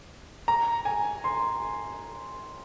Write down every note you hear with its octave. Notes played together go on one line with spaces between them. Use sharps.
A#5
G#5
C6